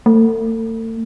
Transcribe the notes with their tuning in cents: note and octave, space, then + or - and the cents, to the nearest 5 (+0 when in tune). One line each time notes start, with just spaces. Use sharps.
A3 +40